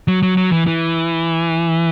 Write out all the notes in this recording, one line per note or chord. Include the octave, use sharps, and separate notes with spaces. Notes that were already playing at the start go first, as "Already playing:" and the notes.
F#3
F#3
F#3
E3
E3